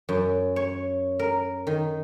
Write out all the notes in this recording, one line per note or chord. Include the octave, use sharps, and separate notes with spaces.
F#2
C#5
A#4
D#3